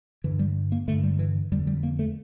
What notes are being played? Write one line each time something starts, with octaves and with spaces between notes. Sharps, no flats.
G2 D3 E3
G3
A#3
G2 D3 A3
G3
E3
F2 D3 G3
G3
A#3
A3